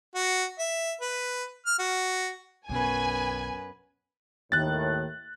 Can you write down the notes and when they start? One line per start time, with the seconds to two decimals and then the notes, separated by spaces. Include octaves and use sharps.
0.15 F#4
0.59 E5
1.01 B4
1.66 F6
1.79 F#4
2.69 B1 F#2 B4 G#5
4.52 D#2 A2 D#3 F#6 A6